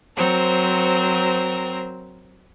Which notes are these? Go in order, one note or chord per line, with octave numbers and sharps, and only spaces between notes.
F#3 C4 A#4 C5